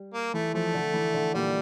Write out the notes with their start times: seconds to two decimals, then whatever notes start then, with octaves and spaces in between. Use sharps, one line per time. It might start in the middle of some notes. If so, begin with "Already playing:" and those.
Already playing: G3
0.14 A#3
0.34 E3 A3
0.54 F3 A3
0.74 D3
0.94 E3
1.14 D3
1.34 A#2 G3